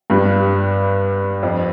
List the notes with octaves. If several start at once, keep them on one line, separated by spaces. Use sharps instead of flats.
G2 G3
F2 F3